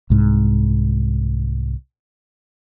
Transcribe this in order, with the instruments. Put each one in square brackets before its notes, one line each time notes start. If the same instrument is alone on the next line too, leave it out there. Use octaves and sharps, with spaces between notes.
[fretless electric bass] C2 G#2